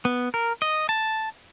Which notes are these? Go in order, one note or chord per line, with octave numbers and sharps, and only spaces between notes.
B3
A#4
D#5
A5